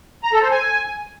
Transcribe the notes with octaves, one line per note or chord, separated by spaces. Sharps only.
A#5
A4
C5
G#5